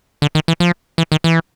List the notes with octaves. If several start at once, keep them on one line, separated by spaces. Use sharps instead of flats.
D3
D#3
E3
F3
E3
D#3
E3